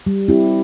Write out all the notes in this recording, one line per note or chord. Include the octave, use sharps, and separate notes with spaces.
G3
C4 E4 G4